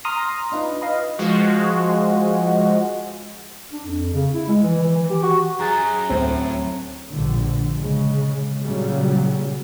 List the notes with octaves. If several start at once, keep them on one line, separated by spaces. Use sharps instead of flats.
A#5 C6 D#6 F6 A#6 C7
D4 D#4 F4 B4
B4 D#5 F5
F3 G#3 F#4
D4
F2
C#3
E4
G#3
E3
E3
E3
G4
F#4
F#2 G#4 A#5 F#6 A6
D2 A2 C4
A#1 G2 D3
C#3 G#3
A#2 C#3 F#3 G3